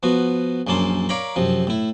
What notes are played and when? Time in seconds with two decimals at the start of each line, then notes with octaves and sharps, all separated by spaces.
0.03 F3 B3 F#4
0.67 A#1 F#2 A#3 C#4 A5 C6
1.09 A#4 C#5 D5 F5 A#5 B5
1.36 F#2 C3 F3
1.67 A2 E4